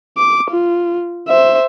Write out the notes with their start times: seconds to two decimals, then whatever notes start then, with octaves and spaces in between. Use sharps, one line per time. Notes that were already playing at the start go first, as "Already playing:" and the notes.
0.17 D6
0.50 F4
1.28 C5 E5